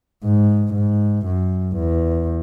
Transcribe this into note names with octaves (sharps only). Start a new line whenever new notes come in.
G#2
G#2
F#2
E2